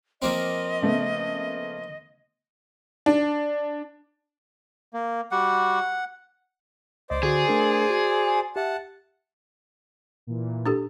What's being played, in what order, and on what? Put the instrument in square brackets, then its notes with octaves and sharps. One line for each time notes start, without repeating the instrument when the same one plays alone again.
[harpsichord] F3 A#3 C4 [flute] D#5
[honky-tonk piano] C#3 A3 B3
D4
[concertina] A#3
[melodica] G3 F#4 G4 [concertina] F#5
[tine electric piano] C#2 D#5 [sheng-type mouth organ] C5 D5
[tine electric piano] D3 F#4 [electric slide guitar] G#4
[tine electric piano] A3 D4 A#4
F#4
[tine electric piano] G4 E5 [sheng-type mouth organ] F#5 A5
[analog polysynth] A#2 E3
[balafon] D4 G4 A4